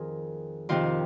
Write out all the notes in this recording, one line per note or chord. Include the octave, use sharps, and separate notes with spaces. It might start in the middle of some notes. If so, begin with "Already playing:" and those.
Already playing: F2 D#3 G#4 A#4 C5
F2 C3 D#3 F4